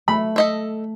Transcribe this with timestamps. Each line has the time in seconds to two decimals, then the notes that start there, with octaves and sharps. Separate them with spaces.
0.08 A3 B5
0.36 A4 D#5 E5